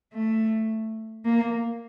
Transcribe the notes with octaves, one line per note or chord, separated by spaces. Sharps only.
A3
A#3